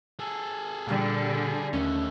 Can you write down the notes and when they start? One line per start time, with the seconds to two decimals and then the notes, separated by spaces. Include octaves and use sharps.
0.19 G#4 A4
0.87 A#2 D3 G3 G5 F6
1.73 D#2 D#3 A3 C#4